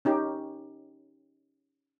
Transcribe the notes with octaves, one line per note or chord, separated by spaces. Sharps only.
C#4 D#4 G4